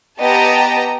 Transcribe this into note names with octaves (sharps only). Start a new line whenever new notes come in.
B3 G4 D#5 G5 A5 A#5